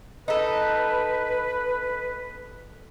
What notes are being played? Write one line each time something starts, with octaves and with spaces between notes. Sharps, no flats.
D#4 A4 B4